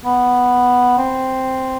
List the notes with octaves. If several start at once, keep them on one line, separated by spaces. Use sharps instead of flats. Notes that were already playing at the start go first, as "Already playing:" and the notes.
B3
C4